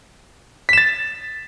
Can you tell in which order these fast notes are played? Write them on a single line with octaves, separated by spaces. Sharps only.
B6 E7 A6